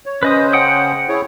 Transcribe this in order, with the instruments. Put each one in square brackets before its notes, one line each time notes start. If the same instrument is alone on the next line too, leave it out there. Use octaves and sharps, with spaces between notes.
[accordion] C#5
[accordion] C#3 C#4 C5 [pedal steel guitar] B4 D#5 D#6
[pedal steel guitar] F#5 G5 D#6
[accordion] E4 G#4 C#5